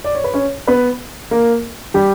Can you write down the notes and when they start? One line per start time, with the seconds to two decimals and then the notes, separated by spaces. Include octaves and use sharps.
0.04 D5
0.15 C#5
0.24 B4
0.34 C#4 C#5
0.68 B3 B4
1.31 A#3 A#4
1.94 G3 G4